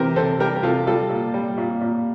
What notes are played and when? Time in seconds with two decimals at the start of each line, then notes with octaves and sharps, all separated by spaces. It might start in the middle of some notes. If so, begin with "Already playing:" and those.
Already playing: C3 E3 G4 A#4 C5
0.16 C3 A4 C5
0.40 G3 G4 A#4
0.57 A#4
0.63 C3 F4 A4
0.87 G3 F4 A4
1.10 A#2
1.34 G3
1.58 A#2
1.81 A#2